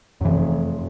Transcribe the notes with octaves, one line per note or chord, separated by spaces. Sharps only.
F1 F#2 E3